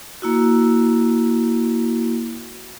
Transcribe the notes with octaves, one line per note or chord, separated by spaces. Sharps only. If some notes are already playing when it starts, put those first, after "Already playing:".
A#3 E4 F#4